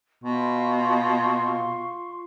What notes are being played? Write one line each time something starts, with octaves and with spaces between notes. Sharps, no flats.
B2 F4 C6 C#6